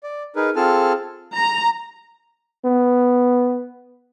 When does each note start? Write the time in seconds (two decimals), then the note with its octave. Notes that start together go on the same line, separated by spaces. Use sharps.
0.03 D5
0.36 D#4 G#4 A#4 B4
0.56 C4 F4 G#4 A4 A5 F6
1.34 A#5
2.65 B3